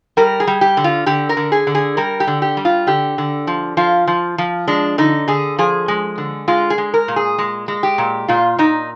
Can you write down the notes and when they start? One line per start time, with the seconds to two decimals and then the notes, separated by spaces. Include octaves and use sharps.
0.17 G3 A#4
0.40 G#4
0.47 G3
0.61 G4
0.77 D3
0.84 F4
1.06 D3 G4
1.29 A#4
1.37 D3
1.52 G#4
1.67 D3
1.75 G#4
1.97 G3 A#4
2.20 G4
2.27 D3
2.42 G4
2.57 G3
2.65 F4
2.87 D3 G4
3.18 D3
3.47 F3
3.77 F3 F4
4.07 F3
4.38 F3
4.68 G#3 D4
4.98 D3 D#4
5.28 D3 G#4
5.58 F3 G#4
5.88 G#3
6.18 D3
6.48 G#3 F4
6.70 G#4
6.78 G#3
6.94 A#4
7.08 A#2
7.16 G#4
7.38 G#3
7.68 G#3
7.83 G4
7.98 A#2
8.28 A#2 F4
8.58 A#2 D#4